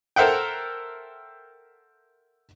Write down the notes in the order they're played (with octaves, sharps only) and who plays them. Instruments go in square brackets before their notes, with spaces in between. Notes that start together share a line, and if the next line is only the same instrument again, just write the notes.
[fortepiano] A4 A#4 C5 E5 F#5 G5